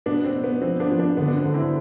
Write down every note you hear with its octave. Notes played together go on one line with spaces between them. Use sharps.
B2 B3 D4
C4
B2
B3
F3 C4
B3 D4
F3
B3 D4
D3 B3
D4
C4
D3
C4 E4